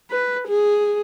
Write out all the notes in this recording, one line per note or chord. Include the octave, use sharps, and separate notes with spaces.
B4
G#4